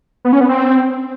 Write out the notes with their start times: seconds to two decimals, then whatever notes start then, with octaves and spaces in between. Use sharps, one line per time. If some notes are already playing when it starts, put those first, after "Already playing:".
0.25 B3
0.33 C#4
0.41 B3
0.49 C4